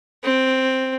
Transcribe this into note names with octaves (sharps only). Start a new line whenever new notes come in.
C4